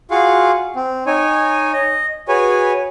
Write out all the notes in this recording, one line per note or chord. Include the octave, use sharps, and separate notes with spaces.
F4 F#4 G#4 F5 F#5
C4
D#4 C#5 G#5
D#5
F#4 G#4 B4 C#5 G#5